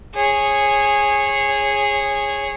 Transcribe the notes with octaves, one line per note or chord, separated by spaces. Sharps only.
G#4 C#5